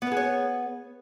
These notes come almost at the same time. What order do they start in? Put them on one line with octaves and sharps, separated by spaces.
B3 B4 G#4 C#5